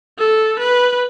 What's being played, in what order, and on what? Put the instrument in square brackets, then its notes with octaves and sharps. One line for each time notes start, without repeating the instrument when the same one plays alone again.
[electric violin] A4
B4